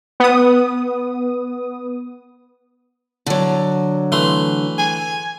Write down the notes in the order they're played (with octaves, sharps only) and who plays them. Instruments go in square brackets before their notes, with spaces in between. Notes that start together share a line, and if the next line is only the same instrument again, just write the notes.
[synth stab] B3 D#6
[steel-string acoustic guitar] D3 F#3
[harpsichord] E3 A3 C6
[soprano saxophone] G#5